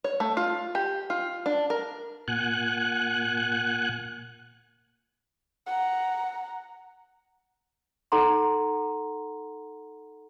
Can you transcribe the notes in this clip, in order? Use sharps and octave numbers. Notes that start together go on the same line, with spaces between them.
C#5
A3
F4
G4
F4
D4
A#4
A#2 F#5 G#5 F#6
F#5 A#5
D#4 A4 F#5 A#5 C6